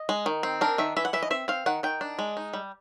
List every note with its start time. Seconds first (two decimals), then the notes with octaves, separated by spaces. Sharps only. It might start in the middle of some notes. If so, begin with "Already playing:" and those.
Already playing: D#5
0.09 G#3
0.26 D#3
0.43 C4
0.61 D4 A#4
0.78 D#3 E5
0.97 E3 E5
1.05 F#5
1.13 E3 E5
1.22 D#5
1.30 C4 E5
1.48 C4 F5
1.66 D#3 F#5
1.83 D#3 G5
2.01 D4
2.19 G#3
2.37 D#4
2.53 G3